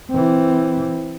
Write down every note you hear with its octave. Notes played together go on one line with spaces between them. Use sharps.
E3 C4